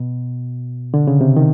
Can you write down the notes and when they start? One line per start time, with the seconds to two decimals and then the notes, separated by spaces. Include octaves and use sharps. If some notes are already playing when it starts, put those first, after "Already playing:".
Already playing: B2
0.94 D3
1.07 C#3
1.21 C3
1.36 D#3